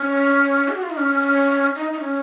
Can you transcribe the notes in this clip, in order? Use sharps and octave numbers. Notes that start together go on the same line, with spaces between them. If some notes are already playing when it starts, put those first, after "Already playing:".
Already playing: C#4
G#4
F#4
F4
D#4
C#4
D#4
D#4
C#4